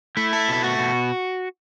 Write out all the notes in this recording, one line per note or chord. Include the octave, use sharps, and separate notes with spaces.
A3 E4
A4
B2 E4
A3 F#4
B2